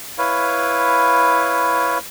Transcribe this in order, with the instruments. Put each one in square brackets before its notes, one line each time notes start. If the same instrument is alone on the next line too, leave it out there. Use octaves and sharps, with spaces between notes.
[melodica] E4 B4 C#5 F5